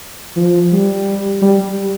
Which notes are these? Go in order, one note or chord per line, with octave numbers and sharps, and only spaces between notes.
F3
G3
G3